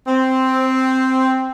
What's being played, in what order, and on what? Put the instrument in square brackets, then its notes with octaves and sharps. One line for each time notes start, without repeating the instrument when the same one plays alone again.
[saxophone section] C4